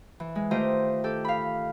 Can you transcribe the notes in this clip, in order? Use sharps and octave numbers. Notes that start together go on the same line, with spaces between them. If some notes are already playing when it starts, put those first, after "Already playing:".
E3
G#3
D#3 A3 F4 G4 C5 D#5
G4 A4
F5 B5